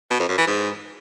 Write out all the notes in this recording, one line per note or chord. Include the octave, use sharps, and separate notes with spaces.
B2
F2
F#2
E3
G#2